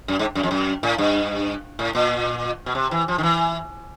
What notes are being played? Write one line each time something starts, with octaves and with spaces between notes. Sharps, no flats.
F#2
G#2
F#2
F2
F#2
A2
G2
A2
A#2
B2
C3
E3
F3
D#3
E3